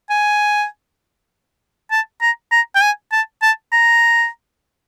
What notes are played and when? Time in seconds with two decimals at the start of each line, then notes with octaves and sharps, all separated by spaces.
0.10 G#5
1.91 A5
2.22 A#5
2.52 A#5
2.75 G5
2.82 G#5
3.12 A5
3.42 A5
3.73 A#5